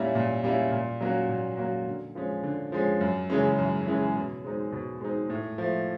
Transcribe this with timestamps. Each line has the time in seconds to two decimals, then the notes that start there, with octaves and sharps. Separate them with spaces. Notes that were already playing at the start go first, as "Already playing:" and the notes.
Already playing: A#2 G3 A#3 C#4 E4
0.15 A#2
0.44 G3 A#3 C#4 E4
0.72 A#2
1.01 F#3 A#3 C#4 F#4
1.29 A#2
1.57 F#3 A#3 C#4 F#4
1.86 D3
2.15 F3 G#3 C#4
2.43 D3
2.72 F3 G#3 C#4
3.01 F#2
3.30 C#3 E3 G#3 C#4
3.58 F#2
3.86 C#3 E3 G#3 C#4
4.15 B2
4.44 G#3 C4 D#4
4.72 B2
5.01 G#3 C4 D#4
5.30 A2
5.58 F3 A3